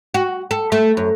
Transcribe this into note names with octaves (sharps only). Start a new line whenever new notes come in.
F#4
A4
A3
F#2